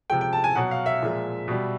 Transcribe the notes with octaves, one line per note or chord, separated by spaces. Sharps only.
C3 F3 G#3 G5
G5
A5
G#5
B2 F#3 F#5
F5
E5
A#2 F3 G#3
B2 G3